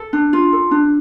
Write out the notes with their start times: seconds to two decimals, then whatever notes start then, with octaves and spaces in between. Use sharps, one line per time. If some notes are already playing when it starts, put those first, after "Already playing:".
Already playing: A4
0.13 D4
0.33 F4
0.53 A4
0.71 D4